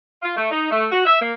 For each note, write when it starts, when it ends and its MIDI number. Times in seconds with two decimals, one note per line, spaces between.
0.23 0.36 65
0.36 0.48 57
0.51 0.68 63
0.70 0.85 57
0.91 1.02 66
1.06 1.20 76
1.21 1.32 58